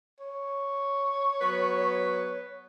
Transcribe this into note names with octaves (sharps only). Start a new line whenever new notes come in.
C#5
F#3 B3 B4